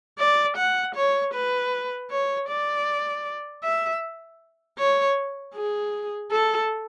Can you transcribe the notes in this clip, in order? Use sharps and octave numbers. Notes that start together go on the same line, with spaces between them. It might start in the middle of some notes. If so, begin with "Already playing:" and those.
D5
F#5
C#5
B4
C#5
D5
E5
C#5
G#4
A4